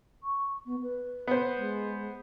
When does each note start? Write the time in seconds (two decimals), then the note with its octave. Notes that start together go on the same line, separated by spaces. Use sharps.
0.23 C#6
0.65 B3
0.82 B4
1.28 B3 C5
1.56 G#3